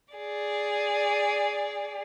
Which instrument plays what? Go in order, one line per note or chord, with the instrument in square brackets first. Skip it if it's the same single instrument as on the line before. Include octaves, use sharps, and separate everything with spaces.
[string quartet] G#4 D5